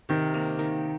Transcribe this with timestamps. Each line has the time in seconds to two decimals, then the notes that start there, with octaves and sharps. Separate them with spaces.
0.09 C3 D#3
0.34 A#3
0.59 D#3